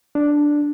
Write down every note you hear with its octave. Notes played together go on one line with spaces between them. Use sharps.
D4